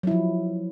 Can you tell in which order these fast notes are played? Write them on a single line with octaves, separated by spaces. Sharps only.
F#3 E4 F3